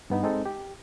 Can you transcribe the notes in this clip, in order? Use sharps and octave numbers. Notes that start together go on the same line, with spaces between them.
G2 B3 D#4
G#3 C4 D#4 A4
G4